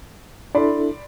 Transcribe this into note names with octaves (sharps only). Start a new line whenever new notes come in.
D4 E4 A4 D5 B5 C6